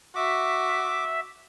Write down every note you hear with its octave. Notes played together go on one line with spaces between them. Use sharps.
F#4 E5 D6